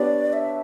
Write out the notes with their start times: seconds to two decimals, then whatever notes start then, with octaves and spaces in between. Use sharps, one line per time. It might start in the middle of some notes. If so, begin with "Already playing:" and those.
Already playing: B3 D4 G4 C#5 D5
0.33 E5